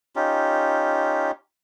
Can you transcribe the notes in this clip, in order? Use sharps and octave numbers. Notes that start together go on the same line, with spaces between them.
C#4 D#4 F4 G4